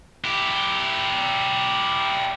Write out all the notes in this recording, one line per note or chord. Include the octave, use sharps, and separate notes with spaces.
E4 G4